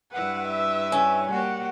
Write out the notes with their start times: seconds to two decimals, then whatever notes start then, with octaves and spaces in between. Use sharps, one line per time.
0.13 G2 E4 B4 F#5
0.48 E5
0.92 C#4
1.31 A#3 F#4 G4 F#5